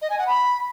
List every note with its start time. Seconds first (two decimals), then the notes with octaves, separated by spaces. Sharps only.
0.01 D#5
0.10 G#5
0.18 F#5
0.27 B5